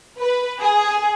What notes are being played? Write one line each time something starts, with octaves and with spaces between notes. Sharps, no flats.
B4
G#4